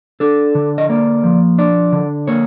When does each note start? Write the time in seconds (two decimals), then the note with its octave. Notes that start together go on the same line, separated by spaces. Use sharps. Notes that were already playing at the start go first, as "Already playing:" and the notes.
0.20 D4 A4
0.55 D3
0.78 D#5
0.89 A#3 D5
1.24 F3
1.58 D4 D5
1.92 D3
2.27 A#3 C#5